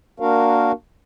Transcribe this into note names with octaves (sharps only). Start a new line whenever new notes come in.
A#3 D4 F#4 A#4 F5